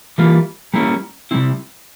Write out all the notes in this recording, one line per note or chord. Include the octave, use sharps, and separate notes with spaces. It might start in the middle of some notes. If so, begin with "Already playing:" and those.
E3 G3 A#3 F4
G3 A#3 C#4 E4
C3 G3 C4 E4